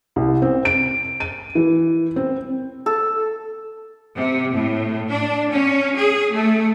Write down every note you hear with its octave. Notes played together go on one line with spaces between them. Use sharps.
C2
C4
D7
D#7
E3
C4
A4
C3
A2
D4
C#4
G#4
A3